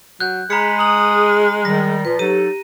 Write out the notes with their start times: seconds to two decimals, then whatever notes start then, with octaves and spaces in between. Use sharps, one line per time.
0.20 F#3 F#6 G6
0.50 G#3 G#4 A#5 B5 C#7
0.79 A#5 D#6 F#7
1.65 D#3 G3 A#6
2.05 A#2 F3 F4 B4
2.19 F#3 D#4 G4 A4 D#7